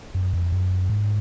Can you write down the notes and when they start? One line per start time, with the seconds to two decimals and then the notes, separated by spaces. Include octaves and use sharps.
0.14 F#2
0.33 F2
0.52 F#2
0.90 G#2